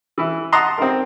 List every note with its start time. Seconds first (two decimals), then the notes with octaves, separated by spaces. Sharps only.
0.18 E3 E4
0.52 D#5 F#5 A5 A#5 C6 D#6
0.78 C4 D#4 A#4